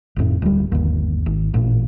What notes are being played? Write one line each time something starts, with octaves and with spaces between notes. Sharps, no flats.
G1 F2 A2
D1 G3
G1 D#2
G#1
A1 A#2